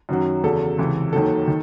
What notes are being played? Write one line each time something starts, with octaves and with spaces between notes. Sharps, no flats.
F#2 D#3 F#3
E2 C#3 F#3 A4
C#2 C3 E3
D#2 D#3 F#3 A4
D#3